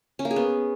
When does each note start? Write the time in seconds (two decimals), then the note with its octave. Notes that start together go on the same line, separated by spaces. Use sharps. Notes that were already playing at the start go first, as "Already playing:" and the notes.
0.19 C#4
0.25 A#3
0.31 G#4
0.36 B3